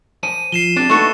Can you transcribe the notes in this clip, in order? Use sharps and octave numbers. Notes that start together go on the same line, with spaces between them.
C5 G#5 A5 D#7
F3 C7 E7 G7
C4 D4 G4
A3 A#3 D#4 F#4 B4